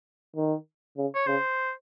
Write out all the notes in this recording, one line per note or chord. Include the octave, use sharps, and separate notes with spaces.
D#3
C#3
C#5
C#3 C5